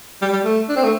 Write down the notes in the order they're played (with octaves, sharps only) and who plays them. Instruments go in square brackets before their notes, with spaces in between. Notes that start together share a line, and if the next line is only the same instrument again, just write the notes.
[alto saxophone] G3
G3
A3
D4
C4
A3